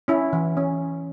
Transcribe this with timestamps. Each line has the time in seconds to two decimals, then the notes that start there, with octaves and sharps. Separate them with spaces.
0.08 C#4 E4
0.33 E3
0.57 C#4